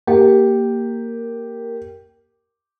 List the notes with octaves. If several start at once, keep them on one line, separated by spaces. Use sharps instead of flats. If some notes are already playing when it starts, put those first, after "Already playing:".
A#3 G4 A#4